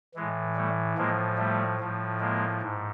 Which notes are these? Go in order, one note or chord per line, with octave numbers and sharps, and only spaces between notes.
A2 E3 G#3
G3 A3
A2 F3 G#3 A#3
G3 A3
A2 F3
G#3 A#3
G#2